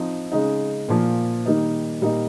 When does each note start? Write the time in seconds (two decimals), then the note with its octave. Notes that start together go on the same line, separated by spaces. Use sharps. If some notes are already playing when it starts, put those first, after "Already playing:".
Already playing: F3 C4 D#4
0.32 C#3 G#3 D#4
0.88 A#2 F3 A#3
1.46 D#3 G3 A#3 D#4
2.01 A#2 G3 A#3 D#4